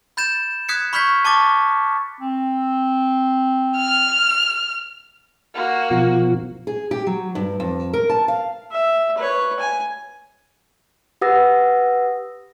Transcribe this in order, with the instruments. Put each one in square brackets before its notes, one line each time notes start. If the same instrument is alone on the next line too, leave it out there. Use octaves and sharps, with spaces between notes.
[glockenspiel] B5 G6 A6 E7
D#6 F#6 G#6 B6 C#7
B5 C#6 F6 G6 G#6 B6
A5 C#6 D6 A6
[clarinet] C4
[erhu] F6
[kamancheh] A#3 F#4
[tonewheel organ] B2 F3
[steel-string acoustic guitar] G#4
G4
F#3
G2
F2
A#4
A5
F5
[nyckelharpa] E5
B4 C#5
G#5
[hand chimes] G4 B4 F#5 D#6 E6 A#6